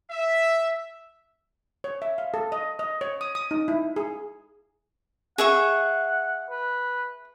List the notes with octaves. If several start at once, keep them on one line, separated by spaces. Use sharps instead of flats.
E5
C#5
E5
F5
A4
D#5
D#5
C#5
D#6
D#6
D#4
E4
G#4
G#4 E5 F#5 C#6
B4